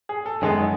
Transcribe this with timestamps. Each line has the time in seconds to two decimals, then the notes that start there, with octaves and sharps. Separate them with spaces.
0.09 G#4
0.26 A4
0.42 F#2 D#3 G#3 B3 G#4